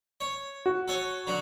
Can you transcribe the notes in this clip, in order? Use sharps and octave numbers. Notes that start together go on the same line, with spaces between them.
C#5
F#4
A4 C#5 G#5
D3 F#3 F#4